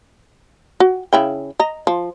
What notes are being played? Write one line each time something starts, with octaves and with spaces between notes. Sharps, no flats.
F#4
C#3 E4 G5
D#5 A#5
F3